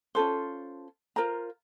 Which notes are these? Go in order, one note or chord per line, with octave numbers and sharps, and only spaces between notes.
C#4 F4 A4 C5
F4 A#4 C5 A#5